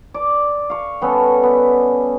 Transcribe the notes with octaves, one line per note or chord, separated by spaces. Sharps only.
D5
F5 C#6
G3 B3 C#4 A4
B3